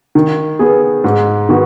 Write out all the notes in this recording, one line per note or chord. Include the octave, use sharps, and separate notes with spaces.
D#3
B3 G#4
G#2
D#3 B3 F#4